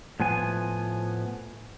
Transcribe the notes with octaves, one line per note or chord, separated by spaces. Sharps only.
A2 F3 B3 G#5